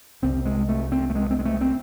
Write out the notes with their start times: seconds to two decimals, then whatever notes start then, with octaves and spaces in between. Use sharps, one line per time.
0.22 C2 C3 C4
0.45 G#3
0.69 A3
0.92 C4
1.10 A3
1.15 G#3
1.31 C4
1.39 G#3
1.45 A3
1.61 C4